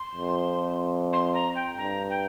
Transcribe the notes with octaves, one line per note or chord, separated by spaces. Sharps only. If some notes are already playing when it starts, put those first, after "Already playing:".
Already playing: C6
F2
C6
A#5
G5
G2 A#5
G5